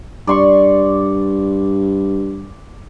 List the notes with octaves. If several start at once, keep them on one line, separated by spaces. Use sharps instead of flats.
G2 D5 C6 C#6